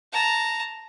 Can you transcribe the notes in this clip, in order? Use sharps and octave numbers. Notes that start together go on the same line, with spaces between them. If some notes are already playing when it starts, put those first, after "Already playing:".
A5 A#5